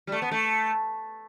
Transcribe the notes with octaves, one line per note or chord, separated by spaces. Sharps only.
G3
A3
B3
A3